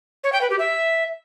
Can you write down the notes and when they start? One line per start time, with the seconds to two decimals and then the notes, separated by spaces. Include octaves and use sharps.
0.24 C#5
0.33 G5
0.41 B4
0.50 G4
0.59 E5